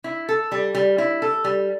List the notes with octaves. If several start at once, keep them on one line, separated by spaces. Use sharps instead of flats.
E4
A4
G3
G3
E4
A4
G3